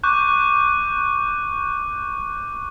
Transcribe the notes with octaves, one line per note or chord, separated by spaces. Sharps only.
C#6 D6 F#6 G6